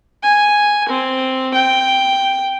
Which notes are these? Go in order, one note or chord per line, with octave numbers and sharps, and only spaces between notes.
G#5
C4
G5